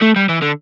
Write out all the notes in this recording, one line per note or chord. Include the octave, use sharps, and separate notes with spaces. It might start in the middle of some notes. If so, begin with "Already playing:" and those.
A3
G3
E3
D3